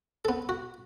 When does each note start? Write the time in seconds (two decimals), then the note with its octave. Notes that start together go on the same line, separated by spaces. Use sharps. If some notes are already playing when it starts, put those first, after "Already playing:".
0.25 B3 A4
0.49 F#4